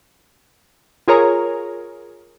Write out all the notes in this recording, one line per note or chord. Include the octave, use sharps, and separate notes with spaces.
F4 G#4 A#4 C#5 A#5